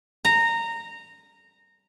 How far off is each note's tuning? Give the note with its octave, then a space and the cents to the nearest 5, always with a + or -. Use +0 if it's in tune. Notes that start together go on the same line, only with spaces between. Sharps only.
A#5 -15